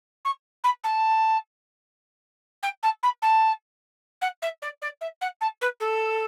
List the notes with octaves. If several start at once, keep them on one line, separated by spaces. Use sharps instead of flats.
C#6
B5
A5
G5
A5
B5
A5
F#5
E5
D5
D5
E5
F#5
A5
B4
A4